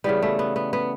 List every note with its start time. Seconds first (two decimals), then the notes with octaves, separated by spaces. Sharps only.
0.04 C#3 E3 G3 B3
0.22 A3
0.39 B3
0.56 B3
0.73 B3